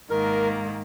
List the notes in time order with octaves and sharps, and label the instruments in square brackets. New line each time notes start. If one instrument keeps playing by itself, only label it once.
[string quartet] G#2 D#3 A#3 [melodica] A#4